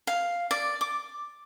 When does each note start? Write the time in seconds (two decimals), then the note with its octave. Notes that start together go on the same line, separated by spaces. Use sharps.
0.07 F5
0.51 D5
0.81 D6